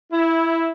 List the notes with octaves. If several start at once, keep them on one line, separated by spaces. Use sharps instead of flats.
E4